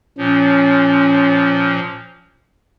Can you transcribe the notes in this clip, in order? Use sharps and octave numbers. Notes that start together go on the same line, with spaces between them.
A#2 F3 C#4